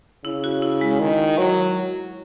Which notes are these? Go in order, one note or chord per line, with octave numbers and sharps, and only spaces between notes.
C#3 E4
F#4
E4
G#3
D#3
F#3